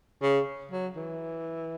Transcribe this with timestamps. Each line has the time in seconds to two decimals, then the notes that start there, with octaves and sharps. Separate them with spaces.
0.22 C#3
0.71 F#3
0.96 E3